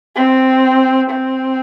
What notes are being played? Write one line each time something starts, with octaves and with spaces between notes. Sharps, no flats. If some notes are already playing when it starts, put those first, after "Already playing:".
C4
C4